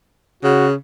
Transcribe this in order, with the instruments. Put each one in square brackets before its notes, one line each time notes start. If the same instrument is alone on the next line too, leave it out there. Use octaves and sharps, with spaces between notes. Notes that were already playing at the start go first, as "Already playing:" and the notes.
[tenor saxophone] C#3 [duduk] F#4